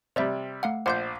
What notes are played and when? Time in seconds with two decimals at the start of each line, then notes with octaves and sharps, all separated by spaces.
0.16 C3 G3 C5 D5 E5
0.63 A3 F5 F#5
0.86 A#1 C5 F#5 C6 D6 G6